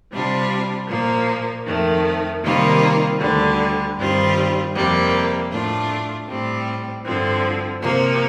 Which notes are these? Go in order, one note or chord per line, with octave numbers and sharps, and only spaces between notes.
C3 G3 D4 F4
A#2 F3 A#3
F2 D#3 A3
C3 D#3 G3 A#3 F4
D2 D3 G3
G2 D#3 G3 C4 F4
F2 C3 G3 A#3
A2 A3 D4 F4
A2 G3 C4
G2 D3 F3 C4
C3 F3 A#3